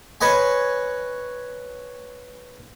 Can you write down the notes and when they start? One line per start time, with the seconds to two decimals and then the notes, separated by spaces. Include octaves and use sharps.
0.21 B4 C#5 D#5 G#5